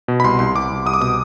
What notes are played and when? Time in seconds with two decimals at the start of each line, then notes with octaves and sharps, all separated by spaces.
0.08 B2
0.20 B5
0.24 C2 C6
0.39 C2 C6
0.55 C2 D6
0.70 C2
0.85 C2 D#6
0.94 D6
1.01 B2 D#6